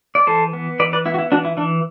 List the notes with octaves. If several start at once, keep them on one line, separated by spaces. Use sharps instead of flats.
D5
E3 A4 C5
B3
E3 B4 D5
B4 D5
B3 E4
F#4
E4
E3 D4 F#4
E4
E3 D4